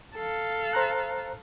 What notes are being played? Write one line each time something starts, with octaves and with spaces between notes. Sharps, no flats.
A4 F5
C5 A#5 F#6